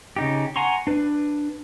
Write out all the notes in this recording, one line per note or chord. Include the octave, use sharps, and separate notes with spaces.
C#3 D#4 G4
F#5 G#5 A#5 C6 C#6
D4 B4